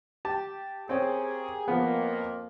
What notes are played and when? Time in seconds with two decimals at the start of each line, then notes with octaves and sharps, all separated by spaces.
0.25 G4 A5
0.89 A#3 C4 C#4 G4 G#4
1.68 F2 F3 A#3 B3